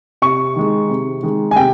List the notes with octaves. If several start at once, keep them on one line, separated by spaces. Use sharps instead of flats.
C3 C#6
D#3 G#3
C3
D#3 G#3
G#5
C3 G5